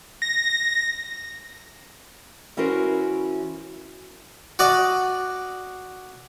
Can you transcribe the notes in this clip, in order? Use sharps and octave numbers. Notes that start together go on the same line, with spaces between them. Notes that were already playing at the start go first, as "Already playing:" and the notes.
A#6
E3 C#4 E4 F#4 A#4 C5
F#4 D5 D#5